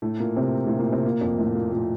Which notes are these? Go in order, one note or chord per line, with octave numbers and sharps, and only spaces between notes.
A2 A3
A#2 A#3
C3 C4
A2 A3
A#2 A#3
C3 C4
A#2 A#3
F2 F3
A2 A3
A#2 A#3
A#2 A#3